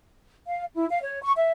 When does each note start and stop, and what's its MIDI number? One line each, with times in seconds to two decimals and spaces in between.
0.46 0.65 77
0.75 0.86 64
0.90 1.02 77
1.02 1.22 73
1.23 1.32 85
1.36 1.51 76